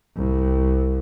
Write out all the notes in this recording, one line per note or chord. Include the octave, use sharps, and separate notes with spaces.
C2